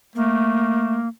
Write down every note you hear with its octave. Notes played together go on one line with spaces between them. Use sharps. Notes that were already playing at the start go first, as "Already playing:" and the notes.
A3 A#3